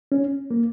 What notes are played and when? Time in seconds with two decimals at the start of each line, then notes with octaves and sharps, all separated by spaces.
0.12 C#4
0.51 A#3